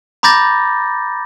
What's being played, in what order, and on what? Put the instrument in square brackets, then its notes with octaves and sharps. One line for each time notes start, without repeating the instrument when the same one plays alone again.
[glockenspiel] A#5 B5 D6 G6 A6 A#6